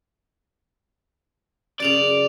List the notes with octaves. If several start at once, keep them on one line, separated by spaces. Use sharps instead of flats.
F#2 C#3 D5 D7 F7